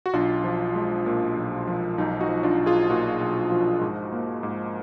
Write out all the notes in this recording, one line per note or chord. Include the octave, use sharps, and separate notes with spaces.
F#4
B1 D4 F4
F3
G#3
A#2
B1
F3
B1 D#4
D#4 F#4
F3
D4 F4
B1
F4 G#4
A#2 D#4 F#4
B1
F3
G#2
A#3
G#2